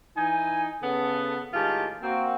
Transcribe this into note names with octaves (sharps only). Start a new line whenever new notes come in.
E3 D#4 G#5
C#3 B3 A4
A2 D#3 G#3 F4 G4 A5
A#3 C4 F#4